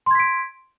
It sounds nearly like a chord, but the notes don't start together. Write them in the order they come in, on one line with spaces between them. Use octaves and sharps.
C6 G#6 B6 D7